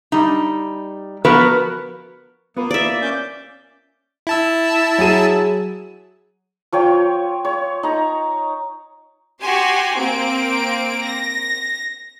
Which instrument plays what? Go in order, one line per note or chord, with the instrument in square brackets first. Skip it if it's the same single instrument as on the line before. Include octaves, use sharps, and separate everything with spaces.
[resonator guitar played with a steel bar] G3 D#4
F3 B3 F#4 A#4 B4
[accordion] A#3 [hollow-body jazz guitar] B3 F4 B4
[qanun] D5 E5
[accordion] C#4 D6 G6
[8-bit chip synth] E4 A5 E6
[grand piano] F#3 G#4 D#7
[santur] F3 C#5 G5
C#5
D#4 A#5
[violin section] F#4 G4 G#5 C6
A#3 C4 D7
A#6